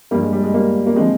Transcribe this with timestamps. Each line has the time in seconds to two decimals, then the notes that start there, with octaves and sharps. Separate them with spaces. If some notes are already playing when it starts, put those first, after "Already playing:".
0.11 G2 G3 A#3
0.14 F3
0.22 G#3
0.33 G3
0.44 G#3
0.54 G3 A#3
0.86 A#3
0.96 D3 F3 G#3 C4